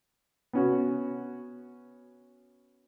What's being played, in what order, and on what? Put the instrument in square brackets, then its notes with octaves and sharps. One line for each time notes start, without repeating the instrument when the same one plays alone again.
[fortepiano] B3 C#4 F#4